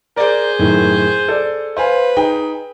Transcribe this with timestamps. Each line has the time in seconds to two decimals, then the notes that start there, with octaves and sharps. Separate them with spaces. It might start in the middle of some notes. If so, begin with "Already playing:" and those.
0.16 G#4 A#4 C5 D5
0.59 F#2 A2 D#3
1.29 A4 D5
1.77 B4 C5 F5 G#5
2.17 D#4 G#4 G5